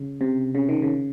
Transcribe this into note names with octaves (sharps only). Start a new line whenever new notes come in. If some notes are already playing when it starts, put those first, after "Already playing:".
Already playing: C#3
C3
C#3
D#3
C#3